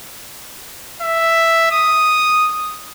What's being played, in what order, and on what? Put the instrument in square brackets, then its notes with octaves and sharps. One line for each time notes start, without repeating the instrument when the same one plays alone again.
[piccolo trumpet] E5
D#6